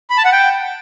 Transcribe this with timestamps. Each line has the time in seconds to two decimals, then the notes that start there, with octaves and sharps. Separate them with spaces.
0.10 B5
0.17 A5
0.25 F#5
0.32 G5